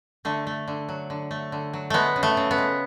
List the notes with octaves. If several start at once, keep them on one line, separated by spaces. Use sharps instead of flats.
D3 A3
A3
D3
F#3
D3
A3
D3
F#3
G#3 A3 B3
C#3
A3
C#3
B3
G#3